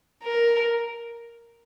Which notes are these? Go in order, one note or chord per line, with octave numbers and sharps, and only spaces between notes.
A#4